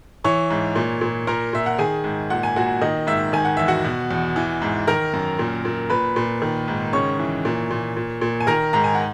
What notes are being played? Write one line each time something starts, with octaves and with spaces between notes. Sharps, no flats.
E3 C#5 C#6
G#2
A#2
A#2
A#2 A#4 A#5
A#2 E5
F#5
D#3 G#4 G#5
G#2
A#2 F#5
G#5
A#2 F#4 F#5
D#3 D#5
G#2 E5
D#3 G#5
F#5
E2 E5
F#4 F#5
B2
E2
E3
G#2
D#3 A#4 A#5
F#2
A#2
A#2
A#2 B4 B5
A#2
D#3
G#2
C#3 C#5 C#6
E3
A#2
A#2
A#2
A#2
G#5
D#3 A#4 A#5
G#2 A#5
G#5
F#5